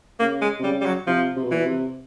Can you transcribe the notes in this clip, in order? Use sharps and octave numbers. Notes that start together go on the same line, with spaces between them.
C#3 A#3
G#3
C3
C#3 G3
G3
F#3
C3 F3
C3
B2
A#2 E3
B2
C3